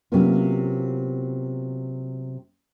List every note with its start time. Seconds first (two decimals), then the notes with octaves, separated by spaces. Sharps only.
0.12 C3 F#3 A#3 B3 C#4 F4